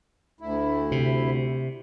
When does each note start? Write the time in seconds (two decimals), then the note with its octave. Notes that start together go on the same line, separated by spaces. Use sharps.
0.41 D2 E4
0.92 C3